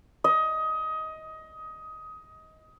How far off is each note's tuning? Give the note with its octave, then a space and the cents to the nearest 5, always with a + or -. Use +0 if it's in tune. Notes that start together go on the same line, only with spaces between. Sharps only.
D#5 +20